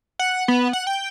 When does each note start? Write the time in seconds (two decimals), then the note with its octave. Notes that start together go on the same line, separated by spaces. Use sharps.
0.19 F#5
0.48 B3
0.73 F#5
0.87 G5